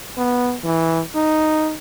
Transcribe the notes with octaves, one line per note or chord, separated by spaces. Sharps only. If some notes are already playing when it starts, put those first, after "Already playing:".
B3
E3
D#4